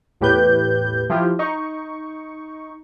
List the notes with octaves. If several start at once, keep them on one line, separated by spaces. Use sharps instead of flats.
E2 A2 G4 B4 G6
F3 E4 F4 G4
D#4 C#6